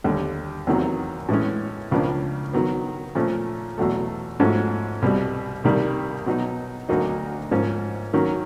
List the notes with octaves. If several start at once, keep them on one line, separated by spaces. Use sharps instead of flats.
D#2 D3 G3
E2 C3 D#3 F#3 A#3
A2 E3 G#3 C#4
C#2 C#3 F3 A#3 D4
D#3 F#3 B3
A#2 F3 A3 C#4
E2 B2 F#3 A3
G#2 F3 A3 C#4 F#4
C2 B2 G3
C2 C3 D#3 G3 A#3
B2 F#3 B3 D#4
D2 D3 F#3 A#3 D#4
G#2 F3 A#3 C#4
D#3 F#3 A#3 C#4